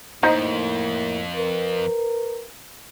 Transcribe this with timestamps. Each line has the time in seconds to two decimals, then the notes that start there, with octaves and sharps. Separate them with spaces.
0.23 F2 A2 A#3 D#4 C5 D#5
1.36 A#4 B4